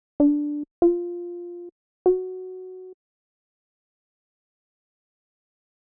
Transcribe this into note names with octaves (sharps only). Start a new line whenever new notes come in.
D4
F4
F#4